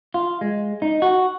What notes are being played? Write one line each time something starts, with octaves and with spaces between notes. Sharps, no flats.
F4
G#3
D#4
F#4